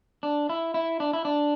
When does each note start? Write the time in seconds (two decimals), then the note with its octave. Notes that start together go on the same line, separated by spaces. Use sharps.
0.23 D4
0.49 E4
0.74 E4
1.00 D4
1.13 E4
1.25 D4